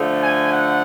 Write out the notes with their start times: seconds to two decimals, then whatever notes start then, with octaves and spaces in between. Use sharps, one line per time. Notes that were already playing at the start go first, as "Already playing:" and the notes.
Already playing: D3 F3 A3
0.22 G#5
0.53 F#5